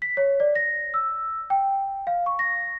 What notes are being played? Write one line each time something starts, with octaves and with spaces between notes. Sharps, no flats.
B6
C#5
D5
A#6
E6
G5
F5
C#6
A#6